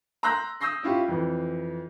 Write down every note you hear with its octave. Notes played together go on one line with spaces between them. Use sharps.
A#5 C6 E6 F#6 G6 A#6
D#6 E6 G6 A#6 C7
C#4 E4 F4 G4
F2 E3